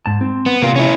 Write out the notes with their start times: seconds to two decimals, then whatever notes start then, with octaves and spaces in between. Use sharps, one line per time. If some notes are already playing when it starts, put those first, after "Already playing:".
0.06 G#2 A5
0.21 C4
0.46 B3
0.62 C3 A#3 F4
0.76 C#4 E4